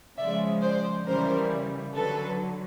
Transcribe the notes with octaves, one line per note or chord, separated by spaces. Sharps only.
C#3 F3 G#3 D5 E5
C5 D5
C#3 E3 G3 A#4 C5
D3 F#3 A4 B4